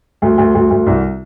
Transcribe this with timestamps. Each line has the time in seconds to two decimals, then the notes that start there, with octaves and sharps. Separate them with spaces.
0.22 D2
0.38 D2
0.55 D2
0.70 D2
0.86 C2